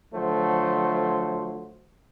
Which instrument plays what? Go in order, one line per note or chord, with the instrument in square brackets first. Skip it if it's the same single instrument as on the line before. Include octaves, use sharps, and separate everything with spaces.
[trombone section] D3 F3 F#3 A3 F#4 C5